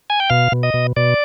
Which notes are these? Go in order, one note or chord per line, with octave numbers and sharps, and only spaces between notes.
G#5
G5
B2 F5
B2
D#5
B2
B2 D5